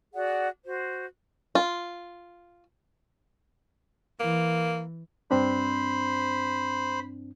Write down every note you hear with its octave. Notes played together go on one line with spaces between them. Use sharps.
F#4 G#4 D5 F#5
F#4 C5
F4
E3 A#3
G2 C4 D4 C5 B5